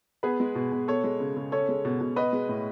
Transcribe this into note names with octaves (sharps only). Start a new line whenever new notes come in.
B3 G#4 B4
G#3
B2
B2
B3 A4 C#5
G#3
C#3
C#3
C#4 A4 C#5
G#3
B2
B2
B3 B4 D#5
G#3
A2